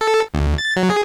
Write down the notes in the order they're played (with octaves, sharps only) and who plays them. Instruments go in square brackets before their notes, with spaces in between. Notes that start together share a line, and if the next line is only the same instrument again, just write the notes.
[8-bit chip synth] A4
D2
A6
F#3
G#4